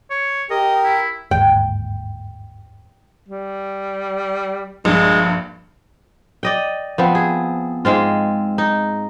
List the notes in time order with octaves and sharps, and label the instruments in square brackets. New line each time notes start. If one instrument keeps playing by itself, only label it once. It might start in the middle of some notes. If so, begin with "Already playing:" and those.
[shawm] C#5
[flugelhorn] G4 [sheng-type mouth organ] A#4 [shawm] D#5
[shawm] E4
[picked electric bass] G1 D#2 G#2 [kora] G5
[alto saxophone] G3
[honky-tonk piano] A#1 G2 [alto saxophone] G#3
[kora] D5 D#5 G5
F3 B3 C4
G#4
G#2 G#3 C4 F4
D#4